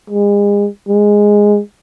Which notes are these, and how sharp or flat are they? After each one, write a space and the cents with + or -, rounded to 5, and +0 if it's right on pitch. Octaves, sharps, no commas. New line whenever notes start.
G#3 -35
G#3 -5